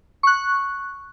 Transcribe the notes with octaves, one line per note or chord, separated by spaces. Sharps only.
C#6 F#6